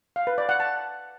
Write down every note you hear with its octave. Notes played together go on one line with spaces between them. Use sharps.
F5
B4
D5
F#5
A5